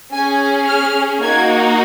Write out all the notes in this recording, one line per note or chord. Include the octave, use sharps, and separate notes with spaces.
C#4 G#4 G#5
F6
A#3 D#4 F#4 G#6